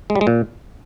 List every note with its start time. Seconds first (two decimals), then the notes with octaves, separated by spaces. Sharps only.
0.10 G#3
0.15 G3
0.21 G#3
0.27 A#2